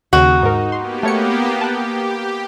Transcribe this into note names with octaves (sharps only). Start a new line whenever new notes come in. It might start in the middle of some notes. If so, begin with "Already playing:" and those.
D#2 C#3 D#4 F#4
G#2 A#4
A#3 B3 G4 C6
A3 C#5 C#7
G4 A5 F#6